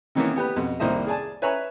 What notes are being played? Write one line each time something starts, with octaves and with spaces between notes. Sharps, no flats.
C3 D#3 E3 A#3 B3 C#4
B3 G4 B4
F2 B2
C2 D#3 A#3 C5 D#5 E5
G#4 D5 G#5 A5
B4 C#5 E5 G#5 A#5 B5